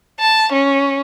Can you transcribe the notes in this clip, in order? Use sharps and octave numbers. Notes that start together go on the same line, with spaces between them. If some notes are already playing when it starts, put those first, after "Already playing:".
A5
C#4